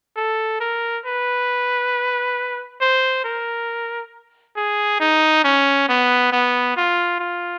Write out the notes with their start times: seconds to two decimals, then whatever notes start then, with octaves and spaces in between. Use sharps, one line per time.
0.16 A4
0.60 A#4
1.06 B4
2.81 C5
3.25 A#4
4.57 G#4
5.00 D#4
5.45 C#4
5.89 B3
6.32 B3
6.77 F4
7.20 F4